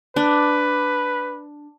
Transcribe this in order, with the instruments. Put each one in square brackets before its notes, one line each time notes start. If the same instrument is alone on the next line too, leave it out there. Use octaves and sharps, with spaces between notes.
[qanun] D4 [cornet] B4